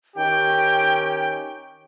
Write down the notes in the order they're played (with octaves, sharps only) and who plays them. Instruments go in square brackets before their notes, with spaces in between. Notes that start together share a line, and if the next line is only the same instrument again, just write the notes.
[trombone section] D#3 C#4 G4 [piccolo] G5